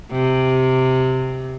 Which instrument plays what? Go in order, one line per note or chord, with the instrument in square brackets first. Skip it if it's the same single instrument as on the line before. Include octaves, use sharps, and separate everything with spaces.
[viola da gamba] C3